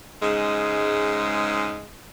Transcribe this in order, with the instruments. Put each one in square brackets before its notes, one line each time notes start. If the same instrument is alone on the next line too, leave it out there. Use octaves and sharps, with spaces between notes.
[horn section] G#2 C#3 G#3